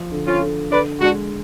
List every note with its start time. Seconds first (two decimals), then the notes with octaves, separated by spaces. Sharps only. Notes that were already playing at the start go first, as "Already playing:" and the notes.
Already playing: F3
0.12 D3
0.26 C#4 F4
0.41 D3
0.70 D3 B4 D5
1.00 G#3 D4 F#4